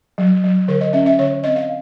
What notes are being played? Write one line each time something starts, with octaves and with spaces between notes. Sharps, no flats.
F#3
F#3
D3 A#4
D#5
C#4 E5
E5
D3 C#5
C4 D#5
F5